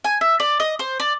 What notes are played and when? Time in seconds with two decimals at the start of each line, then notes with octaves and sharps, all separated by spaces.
0.04 G#5
0.21 E5
0.40 D5
0.60 D#5
0.79 C5
1.00 D5